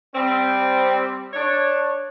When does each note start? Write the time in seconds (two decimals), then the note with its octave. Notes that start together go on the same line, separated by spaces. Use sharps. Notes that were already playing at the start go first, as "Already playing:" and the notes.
0.15 G3 C4
1.33 D4 C#5